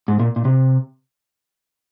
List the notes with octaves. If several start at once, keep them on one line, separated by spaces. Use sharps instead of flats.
G#2
A#2
A#2
C3